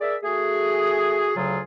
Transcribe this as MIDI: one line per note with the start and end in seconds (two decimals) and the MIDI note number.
0.01 0.16 68
0.01 0.16 70
0.01 0.16 74
0.01 0.16 76
0.23 1.32 57
0.23 1.32 66
0.23 1.32 68
1.36 1.59 38
1.36 1.59 49
1.36 1.59 54
1.36 1.59 65
1.36 1.59 68